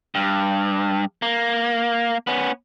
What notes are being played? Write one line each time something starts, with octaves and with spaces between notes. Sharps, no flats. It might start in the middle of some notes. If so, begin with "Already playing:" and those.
G2
A#3
B3 C#4